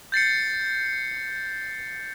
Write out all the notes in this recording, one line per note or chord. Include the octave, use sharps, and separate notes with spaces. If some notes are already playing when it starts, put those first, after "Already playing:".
G6 A6 C7 C#7